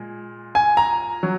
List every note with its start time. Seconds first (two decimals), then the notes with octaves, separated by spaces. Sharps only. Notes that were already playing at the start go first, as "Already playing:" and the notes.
Already playing: A#2 G#3
0.55 G#5
0.77 A#5
1.23 F#3